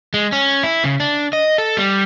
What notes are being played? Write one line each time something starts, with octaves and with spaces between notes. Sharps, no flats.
G#3
C#4
E4
C#3
D4
D#5
A4
G3